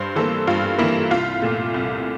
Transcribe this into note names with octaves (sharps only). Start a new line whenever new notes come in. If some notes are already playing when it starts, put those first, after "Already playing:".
Already playing: G2 C5
E3 A#3 A4
G2 F4
E3 A#3 E4
C2 F4
A#2 A3
C2